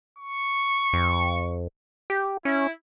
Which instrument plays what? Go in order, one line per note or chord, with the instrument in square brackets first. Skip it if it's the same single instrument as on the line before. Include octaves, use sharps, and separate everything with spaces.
[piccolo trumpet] C#6
[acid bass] F2
G4
[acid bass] C#4 [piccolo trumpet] E4